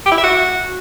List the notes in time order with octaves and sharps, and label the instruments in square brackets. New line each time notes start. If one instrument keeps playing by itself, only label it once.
[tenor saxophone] G4
E4
E5
F#4